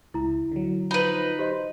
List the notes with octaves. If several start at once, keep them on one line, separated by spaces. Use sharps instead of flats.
C#2 E4 A#5
D3 F#3
F3 D#4 B4 B5 F#7
G4 C5 D#5